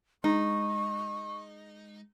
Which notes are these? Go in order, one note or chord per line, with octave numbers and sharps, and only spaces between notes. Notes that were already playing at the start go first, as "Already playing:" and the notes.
G#3 D#4 C#6